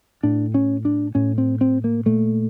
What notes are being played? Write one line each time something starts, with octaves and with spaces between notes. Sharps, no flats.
A2 D4
C#4
D4
A2 C#4
C4
C4
A#3
A#2 A3